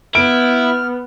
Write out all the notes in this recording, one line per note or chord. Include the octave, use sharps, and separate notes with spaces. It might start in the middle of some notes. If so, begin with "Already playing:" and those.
B3 E4 F6 D7